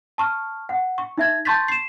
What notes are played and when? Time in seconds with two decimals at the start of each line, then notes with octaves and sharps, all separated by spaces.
0.18 A5 C#6 F6
0.69 F#5
0.98 C#6
1.18 D#4 E5 G#6
1.45 A5 C6 C#6 G6 A6 B6
1.68 C7 E7